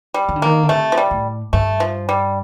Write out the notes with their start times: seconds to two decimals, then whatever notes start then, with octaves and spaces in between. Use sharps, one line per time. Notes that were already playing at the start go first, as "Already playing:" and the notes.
0.14 G3
0.29 D#3
0.36 D3
0.42 D#3 A#3
0.63 D3
0.69 C3 A3
0.92 F3
0.97 G3
1.11 A2
1.53 G2 A3
1.80 F3
2.09 G3